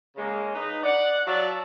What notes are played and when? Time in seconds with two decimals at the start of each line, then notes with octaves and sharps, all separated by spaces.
0.16 C#3 G#3 A#3
0.55 D#4 B4
0.83 D5 F#5
1.27 F#3 D5 E5 F5 A5